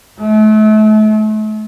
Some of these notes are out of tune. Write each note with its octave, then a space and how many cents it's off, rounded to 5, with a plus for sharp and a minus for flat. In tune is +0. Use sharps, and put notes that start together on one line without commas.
A3 -40